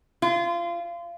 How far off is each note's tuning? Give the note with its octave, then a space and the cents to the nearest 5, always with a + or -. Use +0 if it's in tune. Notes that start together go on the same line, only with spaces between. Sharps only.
F4 -25